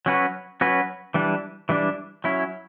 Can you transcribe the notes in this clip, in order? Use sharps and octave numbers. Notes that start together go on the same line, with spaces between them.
F#3 C#4 F#4 B4
F#3 C#4 F#4 B4
E3 G3 D4
E3 G3 D4
F#3 C#4 E4